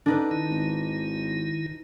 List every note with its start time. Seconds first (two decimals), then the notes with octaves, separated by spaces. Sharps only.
0.06 D3 D4 D#4 B4
0.31 D#3 E4
0.50 G#1